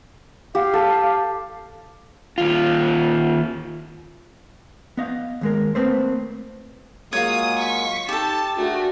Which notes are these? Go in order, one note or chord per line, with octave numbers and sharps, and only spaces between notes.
G4 F5
A4
D#2 F4
B3 D#5 F5
D#2 G#3 A#4
A3 A#3 C4 B4 C5
F#3 G#3 A#3 F4 C#5 D#6
C#6 B6
D#4 G4 A4 A5
A3 D4 F#4 G#4 A#4